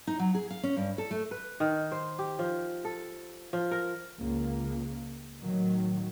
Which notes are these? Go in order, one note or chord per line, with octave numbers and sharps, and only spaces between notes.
D#4
F#3
G#4
F5
C#4
G2
A4
A3
B4
D#3
C5
G4
F3
A4
F3
A#4
C#2 A#3
A2 D#3 F#3